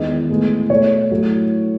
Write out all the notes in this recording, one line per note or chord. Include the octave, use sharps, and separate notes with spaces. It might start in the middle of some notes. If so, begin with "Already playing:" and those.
Already playing: E2 D#3 G#3 B3 D#5
A2 G#3 B3
B2 A3 C#5
A2 F#3 A3